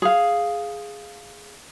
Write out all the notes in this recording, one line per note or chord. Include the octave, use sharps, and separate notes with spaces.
G#4 F5